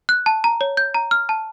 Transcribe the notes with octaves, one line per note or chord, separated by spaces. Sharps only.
F#6
A5
A#5
C#5
G6
A#5
F6
A5